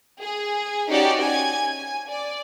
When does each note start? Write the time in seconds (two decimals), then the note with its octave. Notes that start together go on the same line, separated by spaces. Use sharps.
0.21 G#4
0.88 C#4 D#4 F#4 G4 D5
1.22 G#5 G#6
1.73 G#5
2.09 D5